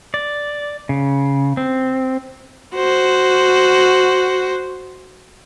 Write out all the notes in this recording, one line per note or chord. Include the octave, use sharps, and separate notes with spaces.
D5
C#3
C4
F#4 C5